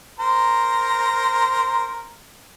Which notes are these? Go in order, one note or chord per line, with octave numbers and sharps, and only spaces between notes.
A#4 C5 A#5